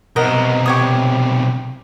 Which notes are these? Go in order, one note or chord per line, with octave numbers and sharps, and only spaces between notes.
B1 C3 A#4 D#5 F#5
G4 C#5 D#6